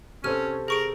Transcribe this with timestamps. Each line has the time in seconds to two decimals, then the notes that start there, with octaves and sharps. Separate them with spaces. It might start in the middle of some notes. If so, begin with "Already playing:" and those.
0.24 C3 C#4 A4 C5 F6 D#7
0.68 G#4 A#4 C#6 D7